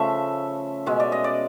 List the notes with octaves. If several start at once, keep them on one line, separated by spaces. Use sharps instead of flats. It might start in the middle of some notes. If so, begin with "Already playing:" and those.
Already playing: C#3 F3 A3 E5
B2 G#3 C#4 E5
D5
D#5
D5